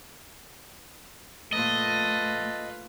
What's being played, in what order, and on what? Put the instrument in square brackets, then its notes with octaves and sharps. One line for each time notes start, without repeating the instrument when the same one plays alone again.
[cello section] A#2 A3 [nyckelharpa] F4 B4 [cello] A4 [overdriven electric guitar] D#5